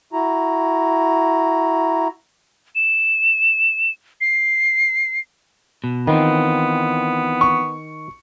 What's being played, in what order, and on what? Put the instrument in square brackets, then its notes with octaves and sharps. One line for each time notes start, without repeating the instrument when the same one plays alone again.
[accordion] E4 F#4 A#5
[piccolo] E7
C7
[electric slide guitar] B2
[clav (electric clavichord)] D#3 [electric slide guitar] E3 C4 F4 [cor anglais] B3
[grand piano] C#6